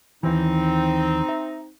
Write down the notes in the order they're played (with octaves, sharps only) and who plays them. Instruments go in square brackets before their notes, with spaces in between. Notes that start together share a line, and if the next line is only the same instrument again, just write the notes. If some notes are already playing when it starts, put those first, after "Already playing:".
[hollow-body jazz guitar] D#2 E3 [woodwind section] C4 D#4
[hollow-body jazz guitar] E5